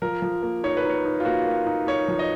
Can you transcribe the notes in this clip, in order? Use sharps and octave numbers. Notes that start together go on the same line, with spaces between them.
F3 A#4
F3
A#3
D#4 C#5
B4
D#4
C#5
D#4
F4
A#3 F#4
A#3
D#4
D#4 C#5
F3
D#5